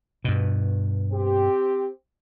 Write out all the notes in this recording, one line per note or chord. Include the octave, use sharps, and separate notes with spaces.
G2 B2
C4 G4